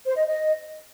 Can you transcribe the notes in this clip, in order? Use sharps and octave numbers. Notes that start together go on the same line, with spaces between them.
C5
D#5
D#5